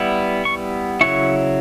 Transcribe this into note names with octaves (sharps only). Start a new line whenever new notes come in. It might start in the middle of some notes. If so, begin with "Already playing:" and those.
Already playing: G3 B3 E4
C#6
C#3 F#3 C#4 E4 C#6